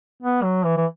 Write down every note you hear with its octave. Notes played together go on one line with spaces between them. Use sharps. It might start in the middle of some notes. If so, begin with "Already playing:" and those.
B3
F#3
E3
E3